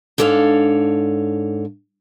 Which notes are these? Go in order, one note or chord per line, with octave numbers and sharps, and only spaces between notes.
G#2 D4 A4 C#5 F5